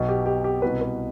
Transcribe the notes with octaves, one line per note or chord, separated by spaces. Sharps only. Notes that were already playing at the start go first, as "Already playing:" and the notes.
Already playing: B1 B2
G4
G4
G4
C2 B2 B4
B4